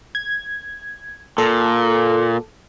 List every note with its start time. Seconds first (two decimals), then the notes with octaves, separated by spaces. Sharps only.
0.15 G#6
1.38 A#2 A4